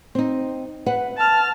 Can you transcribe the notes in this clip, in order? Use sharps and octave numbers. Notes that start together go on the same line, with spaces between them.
C4 D#4
B4 E5 F#5
A5 F6